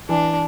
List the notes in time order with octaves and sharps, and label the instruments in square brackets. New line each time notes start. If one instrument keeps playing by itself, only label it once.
[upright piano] E3 [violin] D4